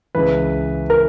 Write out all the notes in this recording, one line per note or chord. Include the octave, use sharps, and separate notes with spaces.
C#2 C#3 E3 B4
A#4